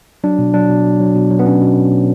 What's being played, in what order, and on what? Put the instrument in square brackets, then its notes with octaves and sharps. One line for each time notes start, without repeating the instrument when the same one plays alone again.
[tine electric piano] F#3 D4
B2
F#3 D4
B2
F#3
F#3
B2
F#3
B3
B2 C#4
B2